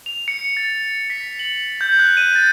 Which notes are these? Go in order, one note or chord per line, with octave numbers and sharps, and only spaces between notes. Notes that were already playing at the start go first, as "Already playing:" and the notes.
F7
C#7
A6
B6
F#7
G6
F#6
D#7
A6